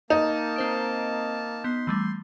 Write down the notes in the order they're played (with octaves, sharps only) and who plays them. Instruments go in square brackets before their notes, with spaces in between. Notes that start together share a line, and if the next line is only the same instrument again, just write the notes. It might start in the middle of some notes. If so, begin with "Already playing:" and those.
[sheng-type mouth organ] A#3 A5 [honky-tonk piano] D#4
[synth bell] C4 C5 D7
[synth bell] B3 G6 [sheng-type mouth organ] C6
[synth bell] E3 G3 A3